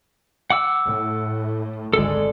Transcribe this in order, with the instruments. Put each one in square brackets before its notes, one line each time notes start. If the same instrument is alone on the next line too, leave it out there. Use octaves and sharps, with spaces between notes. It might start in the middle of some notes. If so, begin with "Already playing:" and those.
[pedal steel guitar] F#5 D6 E6
[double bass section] A2
[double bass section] G#1 D2 G#3 [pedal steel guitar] A4 D5